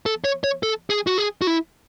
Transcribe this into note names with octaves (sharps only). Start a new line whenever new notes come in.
A4
C#5
C#5
A4
G#4
F#4
G#4
F#4
E4